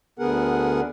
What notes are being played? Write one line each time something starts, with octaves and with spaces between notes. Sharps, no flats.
D2 D3 B3 G#4 A#4 F#5